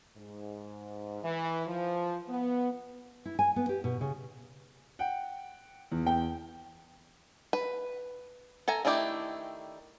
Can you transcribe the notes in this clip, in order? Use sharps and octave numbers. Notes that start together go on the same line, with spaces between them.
G#2
E3
F3
B3
E4
G#5
B3
G4
B2
C#3
F#5 G5
E2
G5
B4
A4 E5 G#5 A#5
D#3 A3 D4 E4 G4